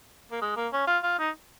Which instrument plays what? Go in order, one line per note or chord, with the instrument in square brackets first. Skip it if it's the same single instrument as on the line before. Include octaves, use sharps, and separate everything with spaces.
[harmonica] A#3
G#3
A#3
C#4
F4
F4
D#4